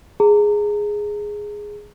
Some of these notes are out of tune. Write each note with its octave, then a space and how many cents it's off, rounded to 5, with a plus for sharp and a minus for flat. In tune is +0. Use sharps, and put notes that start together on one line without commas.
G#4 +0 A#5 -30